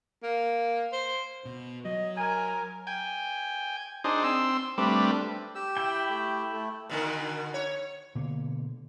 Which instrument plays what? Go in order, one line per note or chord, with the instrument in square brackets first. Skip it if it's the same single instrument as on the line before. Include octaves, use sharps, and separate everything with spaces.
[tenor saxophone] A#3
C5
[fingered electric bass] B2
[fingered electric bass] F#3 [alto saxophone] D#5
[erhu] A#4 [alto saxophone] G#5
[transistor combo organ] G5 G#5
D4 D#4 G#4 C5
C4 C6 E6
G3 A3 C4 D4 B4
[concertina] G4 E6
[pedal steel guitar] E4 G5
[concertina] A3 G4
A3
[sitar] B2 D3 D#3
C#5
[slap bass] B2 D3 A#3